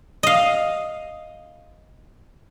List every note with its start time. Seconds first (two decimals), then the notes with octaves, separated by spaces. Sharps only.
0.23 D#5 F5